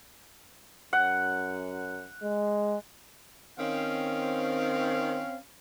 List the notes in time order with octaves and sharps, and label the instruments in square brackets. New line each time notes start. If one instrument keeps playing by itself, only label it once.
[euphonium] F#2 [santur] F#5
[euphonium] G#3
[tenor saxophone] D#3 [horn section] C4 C#4 F5